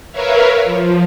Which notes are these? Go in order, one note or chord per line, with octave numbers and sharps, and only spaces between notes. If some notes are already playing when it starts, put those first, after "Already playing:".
A#4 B4 C#5 E5 F5
F3